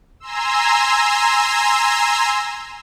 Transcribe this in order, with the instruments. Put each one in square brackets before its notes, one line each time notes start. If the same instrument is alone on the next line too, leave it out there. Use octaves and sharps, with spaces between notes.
[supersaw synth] G#5 A#5 C6 E6